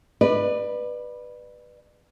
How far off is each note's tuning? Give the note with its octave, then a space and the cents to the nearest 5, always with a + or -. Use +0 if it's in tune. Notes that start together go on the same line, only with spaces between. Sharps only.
B4 -5 D5 +30